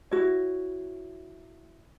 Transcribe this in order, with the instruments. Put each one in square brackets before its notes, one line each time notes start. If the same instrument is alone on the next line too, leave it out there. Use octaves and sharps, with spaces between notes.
[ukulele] E4 F#4 C#5